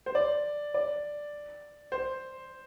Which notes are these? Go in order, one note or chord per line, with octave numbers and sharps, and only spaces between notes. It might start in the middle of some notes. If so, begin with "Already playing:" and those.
C5
D5
D5
C5